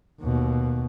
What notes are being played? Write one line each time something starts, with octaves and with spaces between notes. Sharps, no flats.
D#2 B2